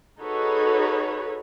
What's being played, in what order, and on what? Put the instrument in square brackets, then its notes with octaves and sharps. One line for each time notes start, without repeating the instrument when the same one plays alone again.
[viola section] D#4 F#4 G#4 A4 B4 C#5